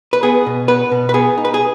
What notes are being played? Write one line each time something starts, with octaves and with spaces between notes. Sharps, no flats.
B4
B3 G#4
B2
B3 B4
B2
B4
B3 G#4
D#4
B4
G#4